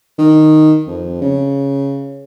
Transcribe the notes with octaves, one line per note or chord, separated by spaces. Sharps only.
D#3
F2
C#3